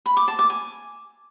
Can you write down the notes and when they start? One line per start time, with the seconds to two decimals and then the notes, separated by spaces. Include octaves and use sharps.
0.06 B5
0.17 D6
0.28 A5
0.39 D6
0.50 G#5